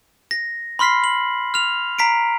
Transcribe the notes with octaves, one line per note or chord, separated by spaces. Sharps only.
A#6
B5 C6 F6 B6 C7
F#7
F6 F7
A#5 B6 C7 D7